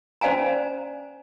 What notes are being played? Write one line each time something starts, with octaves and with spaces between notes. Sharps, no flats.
C#4 C5 D5 F5 G#5 A#5